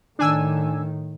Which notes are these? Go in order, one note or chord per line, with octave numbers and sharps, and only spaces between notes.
A2 D#3 D4 G#5 E6